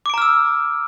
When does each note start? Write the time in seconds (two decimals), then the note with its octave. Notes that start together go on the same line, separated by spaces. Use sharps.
0.06 D6
0.10 D7
0.14 A#5
0.18 F6
0.22 E6